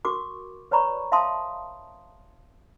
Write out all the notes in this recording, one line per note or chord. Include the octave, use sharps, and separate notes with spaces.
F#4 A#4 C#6 D6
B4 C#5 D5 A#5 B5 C#6
E5 F5 A5 C6 D#6